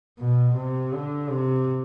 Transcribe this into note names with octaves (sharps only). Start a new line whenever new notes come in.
B2
C3
D3
C3